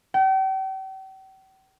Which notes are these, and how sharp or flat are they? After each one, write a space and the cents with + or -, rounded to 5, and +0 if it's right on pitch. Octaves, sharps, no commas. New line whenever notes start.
G5 -40